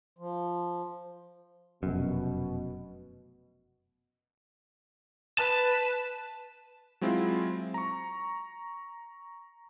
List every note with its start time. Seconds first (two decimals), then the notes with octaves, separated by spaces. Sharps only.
0.18 F3
1.83 F1 F#2 B2
5.39 B4 A5
7.01 F#3 G#3 C4 E4 F4
7.74 A#5 C#6